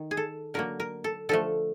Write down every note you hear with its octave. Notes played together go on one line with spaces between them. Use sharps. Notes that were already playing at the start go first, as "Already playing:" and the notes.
Already playing: D#3
G#4
A4
D3 F#3 A#3 A#4
A#4
A4
D3 F3 A3 A4